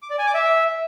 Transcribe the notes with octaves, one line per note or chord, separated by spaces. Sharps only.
D6
D5
G#5
D6
E5